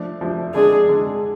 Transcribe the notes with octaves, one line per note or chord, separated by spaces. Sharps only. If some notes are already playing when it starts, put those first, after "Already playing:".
Already playing: F3 A3 D4
F3 A3 D4
D3 G#3 D4 G#4
D3 G#3 D4